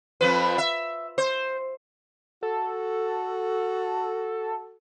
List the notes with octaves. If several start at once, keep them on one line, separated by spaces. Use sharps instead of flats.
F2 F3 B4
E5
C5
F#4 A4